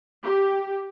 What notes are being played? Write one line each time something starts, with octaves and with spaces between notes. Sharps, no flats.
G4